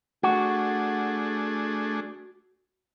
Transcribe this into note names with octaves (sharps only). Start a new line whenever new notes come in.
A3 D4 F#4 G#4